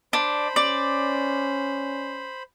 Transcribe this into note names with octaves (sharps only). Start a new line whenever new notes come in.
D4 C5 B5
C#4 D5